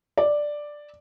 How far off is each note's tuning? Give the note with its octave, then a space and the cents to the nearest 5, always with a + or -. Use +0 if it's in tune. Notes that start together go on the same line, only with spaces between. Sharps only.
D5 +5